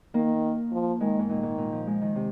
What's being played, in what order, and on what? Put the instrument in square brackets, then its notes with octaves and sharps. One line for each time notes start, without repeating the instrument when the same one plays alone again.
[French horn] D#3 [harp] A#3
[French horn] F3
[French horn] D#3 [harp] G#3
[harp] G#2
[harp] A#2 [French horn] D#3
[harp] G#2
A#2
F3
G#3
D#3
C3